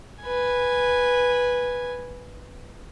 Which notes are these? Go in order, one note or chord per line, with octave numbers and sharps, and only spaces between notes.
B4 G#5